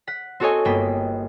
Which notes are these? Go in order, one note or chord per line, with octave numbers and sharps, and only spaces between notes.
F#5 B6
C4 F#4 A4 C#5 D#5 G#5
G1 A#3 B3 G5 B5